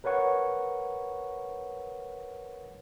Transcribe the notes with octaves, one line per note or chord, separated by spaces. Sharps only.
A#4 B4 C#5 F#5 C#6